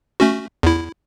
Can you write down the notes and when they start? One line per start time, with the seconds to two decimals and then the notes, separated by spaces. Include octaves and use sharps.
0.20 A3 C#4 F#4
0.63 E2 E4